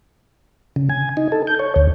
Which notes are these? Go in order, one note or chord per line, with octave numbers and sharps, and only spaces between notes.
C#3
G#5
D#4
A4
G6
C#5
D2